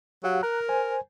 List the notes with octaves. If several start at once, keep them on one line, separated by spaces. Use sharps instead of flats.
F#3 G4 F5 F#5
A#4 A#5 F#6
C5 G#5